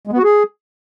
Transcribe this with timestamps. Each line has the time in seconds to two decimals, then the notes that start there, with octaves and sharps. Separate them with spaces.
0.07 G#3
0.13 B3
0.18 F#4
0.24 G#4